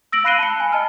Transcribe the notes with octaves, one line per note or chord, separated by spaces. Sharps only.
E6 A#6 D7 F#7
F5 B5 F#6 C7 D#7 G7
A5 B5 C#7
G#5
D#5 A5 F6